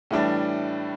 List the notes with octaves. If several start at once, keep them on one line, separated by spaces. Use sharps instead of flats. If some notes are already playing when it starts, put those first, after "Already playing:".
A2 E3 G3 D4